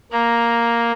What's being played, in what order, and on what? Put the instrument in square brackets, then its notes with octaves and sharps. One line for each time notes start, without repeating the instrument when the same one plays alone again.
[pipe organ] A#3 [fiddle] A#5